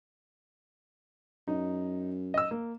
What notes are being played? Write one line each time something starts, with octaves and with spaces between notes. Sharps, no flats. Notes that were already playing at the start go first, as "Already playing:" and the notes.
F#2 D#4
D#5 E6
A#3